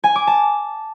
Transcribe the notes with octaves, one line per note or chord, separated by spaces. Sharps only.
G#5
D6
A5